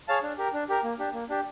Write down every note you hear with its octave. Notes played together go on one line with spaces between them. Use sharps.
G#4 C#5 F5 A5
D4
G4 A#4
D4
G4 A#4
A#3
D4 G4
A#3
D4 G4